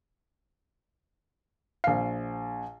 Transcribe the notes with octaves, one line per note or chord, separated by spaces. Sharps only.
A#1 F5 C7